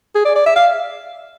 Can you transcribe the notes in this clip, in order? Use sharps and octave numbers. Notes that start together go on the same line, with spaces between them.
G#4
D5
D5
E5
F5